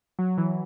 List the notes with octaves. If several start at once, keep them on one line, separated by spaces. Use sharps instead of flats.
F#3
E3